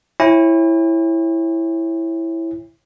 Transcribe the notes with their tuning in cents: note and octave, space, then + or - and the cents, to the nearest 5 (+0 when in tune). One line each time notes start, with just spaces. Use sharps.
E4 +0 C#5 -25 G#5 -45